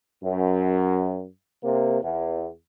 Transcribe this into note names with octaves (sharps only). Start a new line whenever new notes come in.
F#2
C3 A#3
E2